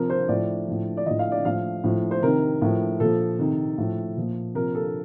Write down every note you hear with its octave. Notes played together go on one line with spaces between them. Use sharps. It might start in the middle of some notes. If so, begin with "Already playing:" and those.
Already playing: C3 F3 A#4
C5
A2 F3 D5
A2 F3
D5
A2 F3 D#5
F5
D5
A2 F3 F5
A2 F3
C5
C3 D#3 A#4
A2 F3
A#2 F3 A4
C3 D#3
A2 F3
A#2 F3
C3 F3 A#4
A4